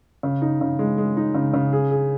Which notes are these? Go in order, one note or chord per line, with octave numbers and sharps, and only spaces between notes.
C#3
D#4
C#3
G#3
G#3
D#4
C#3
C#3
G#4
G#4